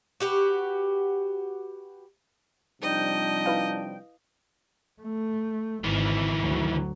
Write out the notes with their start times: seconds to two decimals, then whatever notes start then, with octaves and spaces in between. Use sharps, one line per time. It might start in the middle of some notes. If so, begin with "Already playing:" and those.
0.20 F#4 G4 B4
2.82 C3 F3 G3 D4 D#4 D#5 G5
3.46 E4 B4 F5
5.02 A3
5.84 G#1 D#3 E3
6.42 D2 F#3